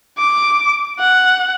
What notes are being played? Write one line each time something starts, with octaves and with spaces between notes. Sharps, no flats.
D6
F#5